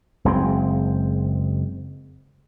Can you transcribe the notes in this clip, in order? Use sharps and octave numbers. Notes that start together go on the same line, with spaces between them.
F#1 G#3 C4